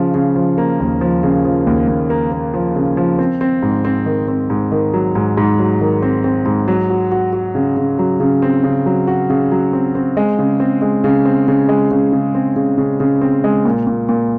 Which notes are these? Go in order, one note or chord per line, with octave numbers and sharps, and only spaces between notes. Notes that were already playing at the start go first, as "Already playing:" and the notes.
Already playing: C#3 F3
C#3
F3
A#3
D#2
F3
C#3
F3
D#2
D#2
A#3
A#3
F3
C#3
F3
C4
C4
G#2
C4
D#3
C4
G#2
D#3
F#3
G#2
G#2
F#3
D#3
C4
C4
G#2
F#3
F#4
F#4
F#4
C#3
C#3
F#3
C#3
C4
C#3
F#3
F#4
C#3
F#3
C4
C4
G#3
C#3
C4
G#3
C#3
C4
C#3
G#3
C#3
C#3
C4
C#3
C#3
C#3
C4
G#3
A#2
A#2
A#2